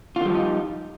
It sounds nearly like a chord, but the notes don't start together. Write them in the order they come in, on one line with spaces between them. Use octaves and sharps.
F4 D3 G3 F3 D#4